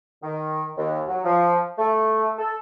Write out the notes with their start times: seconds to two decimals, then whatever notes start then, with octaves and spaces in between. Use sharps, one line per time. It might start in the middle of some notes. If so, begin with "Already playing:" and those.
0.23 D#3
0.77 D#2
1.08 F#3
1.24 F3
1.78 A3
2.39 A4